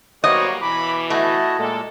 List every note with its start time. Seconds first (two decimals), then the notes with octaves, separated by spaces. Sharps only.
0.24 F#3 G3 A#3 B3 F#4 C5 C#5 D#5
0.61 B2 E3 B5 D6
1.10 A3 E4 F#4 D#5 A5
1.58 A#2 G#3 A#3 A4